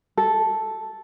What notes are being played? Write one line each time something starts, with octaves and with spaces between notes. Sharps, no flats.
A4